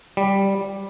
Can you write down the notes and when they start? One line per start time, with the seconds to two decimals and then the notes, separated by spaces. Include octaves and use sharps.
0.17 G3